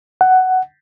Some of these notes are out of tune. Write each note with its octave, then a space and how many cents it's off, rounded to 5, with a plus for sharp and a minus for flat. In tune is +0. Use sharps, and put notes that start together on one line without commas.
F#5 +10